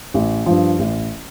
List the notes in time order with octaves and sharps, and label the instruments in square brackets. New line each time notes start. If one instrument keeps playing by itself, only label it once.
[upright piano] A1
G2 F3
A1